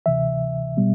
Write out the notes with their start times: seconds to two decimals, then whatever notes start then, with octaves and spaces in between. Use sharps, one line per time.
0.06 D2 C3 E3 E5
0.77 B2 G3 B3